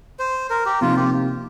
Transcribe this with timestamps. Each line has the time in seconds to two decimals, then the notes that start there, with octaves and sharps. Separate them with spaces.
0.19 C5
0.50 A#4
0.66 G4
0.81 C3 F3 A#3 D#4 F4
0.96 G4